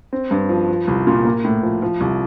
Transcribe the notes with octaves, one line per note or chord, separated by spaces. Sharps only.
C4
G2
F3
F3
C2
A#2
A#3
A2
F3
F3
C2